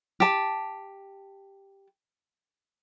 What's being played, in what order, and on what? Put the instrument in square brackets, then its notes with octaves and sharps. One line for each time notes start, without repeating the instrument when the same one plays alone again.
[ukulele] G4 A5